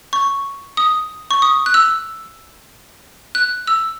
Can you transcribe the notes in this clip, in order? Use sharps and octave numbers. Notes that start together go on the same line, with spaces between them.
C#6
D#6
C#6
D#6
F#6
E6
F#6
E6